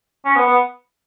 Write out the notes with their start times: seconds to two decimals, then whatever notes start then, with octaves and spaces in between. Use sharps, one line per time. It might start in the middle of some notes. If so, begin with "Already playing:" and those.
0.25 C#4
0.35 B3
0.46 B3